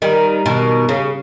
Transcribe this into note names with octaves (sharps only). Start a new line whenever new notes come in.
D#3 G3
B2 D#3
C#3